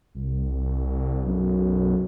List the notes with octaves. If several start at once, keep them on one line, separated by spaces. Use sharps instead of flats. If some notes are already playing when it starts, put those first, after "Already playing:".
C2
B1 F#2